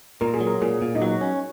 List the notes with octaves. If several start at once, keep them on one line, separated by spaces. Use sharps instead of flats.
A#2 A#4
G#4
F#3
A#4
A#2 G#4
A#2
D#4
F#3 F#4
C#4